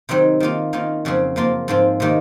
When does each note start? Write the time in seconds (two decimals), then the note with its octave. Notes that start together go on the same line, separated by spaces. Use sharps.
0.09 C3 D#3 F#3 C4 D#4
0.40 D#3 A#3 F4
0.73 D#3 A#3 C#4 F4
1.05 F2 C#3 F#3 C4
1.36 F#2 F3 A#3 F4
1.68 G#2 F3 C4 F4
2.00 C3 D#3 A#3